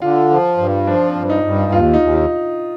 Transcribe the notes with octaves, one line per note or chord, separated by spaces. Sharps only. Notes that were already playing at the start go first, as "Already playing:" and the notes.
D3 F4
F3
G2
F3 D4
C4
G2
D#4
G2
D#2 F4
D#4
D#2
D#4